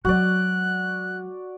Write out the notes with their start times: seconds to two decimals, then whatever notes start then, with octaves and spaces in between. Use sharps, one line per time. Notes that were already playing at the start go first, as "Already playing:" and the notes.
0.05 F#3 G#3 F#4 D5 F#6